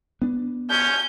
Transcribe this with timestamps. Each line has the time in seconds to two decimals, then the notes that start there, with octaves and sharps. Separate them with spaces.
0.22 B3 D4
0.70 C#4 G6